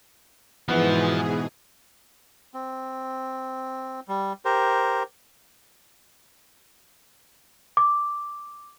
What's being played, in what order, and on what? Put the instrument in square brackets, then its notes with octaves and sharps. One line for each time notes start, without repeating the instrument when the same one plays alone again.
[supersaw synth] G#2 B2 G#4 [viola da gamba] E3 [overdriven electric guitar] F3 [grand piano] B3
[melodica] C4
G3
G4 A#4 C5
[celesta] D6